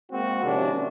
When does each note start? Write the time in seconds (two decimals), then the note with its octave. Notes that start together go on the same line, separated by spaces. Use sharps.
0.11 G#3 A#3 C4 F#4
0.44 C3 D#3 F3 C#4 D4